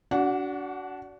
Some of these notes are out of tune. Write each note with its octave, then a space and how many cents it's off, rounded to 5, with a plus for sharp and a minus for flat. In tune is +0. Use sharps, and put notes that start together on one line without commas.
D4 -25 F#4 +15 F#5 -15